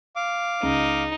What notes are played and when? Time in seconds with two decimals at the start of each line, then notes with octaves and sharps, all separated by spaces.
0.16 F5 D6
0.63 C#2 D#4